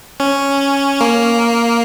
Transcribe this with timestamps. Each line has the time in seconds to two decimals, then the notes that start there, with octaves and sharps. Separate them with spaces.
0.20 C#4
1.01 A#3